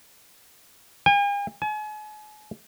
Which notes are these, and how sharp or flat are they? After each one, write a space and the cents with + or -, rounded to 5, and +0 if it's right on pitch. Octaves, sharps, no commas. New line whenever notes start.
G#5 -45
G#5 +40